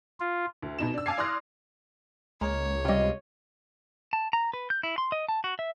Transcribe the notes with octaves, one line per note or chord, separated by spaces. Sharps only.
F4
D2
B2 D#4 E7
D4 E6
F5 G#5 A5 D6 G#6 C7
D5 C6 D#6 F6 F#6 A#6
C#2 G#3 A#3 C#5
C3 G3 F4 D#5
A5
A#5
B4
G6
E4
C6
D#5
A5
F#4
E5